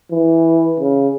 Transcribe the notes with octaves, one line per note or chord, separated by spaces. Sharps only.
E3
C#3